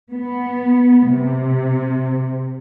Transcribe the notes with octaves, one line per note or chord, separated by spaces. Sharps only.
B3
C3